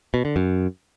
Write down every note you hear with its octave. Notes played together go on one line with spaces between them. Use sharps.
B2
D3
F#2